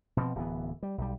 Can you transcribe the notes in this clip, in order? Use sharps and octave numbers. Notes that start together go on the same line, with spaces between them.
B2 F3 C4
D1 E3 B3
G3
B1 G3